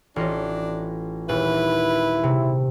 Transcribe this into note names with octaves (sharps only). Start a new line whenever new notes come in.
A1 D4 F4 D#5
D#1 E4 B4
C3